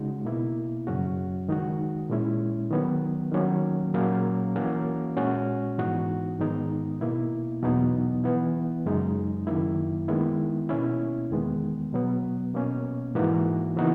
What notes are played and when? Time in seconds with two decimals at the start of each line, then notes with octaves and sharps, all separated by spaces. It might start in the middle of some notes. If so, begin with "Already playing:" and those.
Already playing: C#3 G#3 D#4 F#4
0.25 B2 A#3 E4
0.87 F#2 C#3 F#3 C#4 F#4
1.48 D#3 G#3 D#4 F#4
2.10 A#2 G#3 C#4 E4
2.71 D#3 F#3 B3
3.32 D#3 F#3 A#3 C#4
3.94 A#2 F#3 A#3 C#4
4.56 E3 A#3 C#4 F#4
5.17 A#2 G#3 C#4 F#4
5.78 G#2 E3 B3 D#4 F#4
6.40 G#2 D#3 G#3 B3 D#4
7.01 B2 A#3 E4
7.63 E2 B2 F#3 B3 D#4
8.24 E3 B3 E4
8.86 F#2 C#3 G#3 D#4
9.47 F#2 D#3 A#3 E4
10.08 D#3 G#3 B3 E4
10.69 B2 A#3 C#4 E4
11.31 E2 D#3 G#3 B3
11.93 B2 F#3 B3
12.55 B2 A#3 C#4
13.15 G#2 E3 A#3 D#4 F#4
13.76 C#3 E3 B3 D#4 F#4